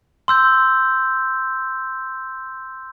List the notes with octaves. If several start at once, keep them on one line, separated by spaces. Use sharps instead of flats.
C6 E6 G6